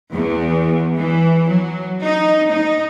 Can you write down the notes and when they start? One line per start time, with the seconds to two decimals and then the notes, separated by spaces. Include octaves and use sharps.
0.12 E2
0.97 E3
1.49 F#3
2.02 D#4
2.50 D#4